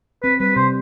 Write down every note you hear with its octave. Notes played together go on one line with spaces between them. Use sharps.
C4 B4
G3 B4
C3 C5